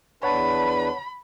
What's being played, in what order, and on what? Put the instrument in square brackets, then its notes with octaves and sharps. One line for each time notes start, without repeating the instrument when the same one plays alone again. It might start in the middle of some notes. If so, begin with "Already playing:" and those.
[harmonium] E2 D4 B4 [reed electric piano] C#5 F#5 A5 [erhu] B5